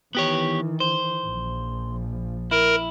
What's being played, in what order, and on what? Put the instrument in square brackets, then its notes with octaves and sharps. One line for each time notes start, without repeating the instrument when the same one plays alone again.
[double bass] D#3 E3 [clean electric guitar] B3 G4 C#5
[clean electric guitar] C5
[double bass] A#1 F3
[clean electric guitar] E4 [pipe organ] A#4